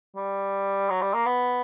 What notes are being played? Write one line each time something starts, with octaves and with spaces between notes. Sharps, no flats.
G3
F#3
G3
A#3
B3